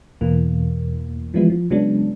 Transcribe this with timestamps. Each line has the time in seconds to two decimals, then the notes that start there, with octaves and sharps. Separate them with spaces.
0.21 E2 B2 E3 A#3
1.34 E3 F3 G3 G#3 B3 E4
1.50 F3
1.70 C#3 F#3 G#3 B3 D4